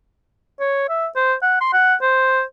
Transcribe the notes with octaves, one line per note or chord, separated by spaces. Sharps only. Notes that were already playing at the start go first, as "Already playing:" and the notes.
C#5
E5
C5
F#5
C6
F#5
C5